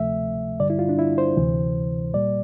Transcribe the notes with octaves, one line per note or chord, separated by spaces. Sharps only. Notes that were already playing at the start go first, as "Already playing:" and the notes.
Already playing: D2 C3 F3 A3 E5
G2 D3 G3 D5
E4
F4
D4
E4
C5
D2 C3 E3
A#2 G3 A#3 D5